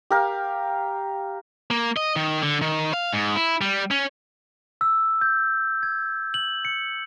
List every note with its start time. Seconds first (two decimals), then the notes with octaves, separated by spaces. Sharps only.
0.11 G4 A#4 F5
1.71 A#3
1.97 D#5
2.16 D#3
2.42 D3
2.62 D#3
2.93 F5
3.13 G#2
3.36 E4
3.61 G3
3.91 C#4
4.81 E6
5.21 G6
5.83 G#6
6.34 F#7
6.65 C#7